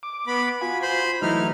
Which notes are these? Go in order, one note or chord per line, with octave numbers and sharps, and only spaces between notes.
D6
B3 B5
F4 F#4 G#5 B5
C5 B5 C6
E3 F#3 A3 D#4 E4 F6